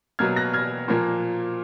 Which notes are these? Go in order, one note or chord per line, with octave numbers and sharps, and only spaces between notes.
B2 F#3 A#3 F6 G#6
F#6 A#6
F6 G#6
A#2 F3 A#3